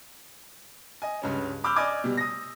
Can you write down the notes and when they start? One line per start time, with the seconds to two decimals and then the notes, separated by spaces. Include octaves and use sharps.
1.02 D#5 G#5
1.22 C#2 G2 C#4
1.64 B5 D6 E6 F6 G6
1.76 D5 D#5 G#5 D6 G#6
2.04 B2 G3
2.17 D#6 A#6